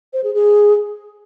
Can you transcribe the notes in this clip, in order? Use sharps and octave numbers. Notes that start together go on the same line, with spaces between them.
C5
G#4
G#4